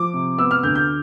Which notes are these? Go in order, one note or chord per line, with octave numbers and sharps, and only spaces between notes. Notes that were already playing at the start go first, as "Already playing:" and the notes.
Already playing: F3 D6
C3
B3 E6
F6
D2 G6
G6